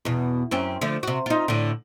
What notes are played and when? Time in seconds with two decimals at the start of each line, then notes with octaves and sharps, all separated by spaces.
0.05 E2 B2
0.51 F#2 C4 C#4
0.81 D3 F3 A3
1.03 C3 F#4
1.26 D#4 F4
1.48 A2 D3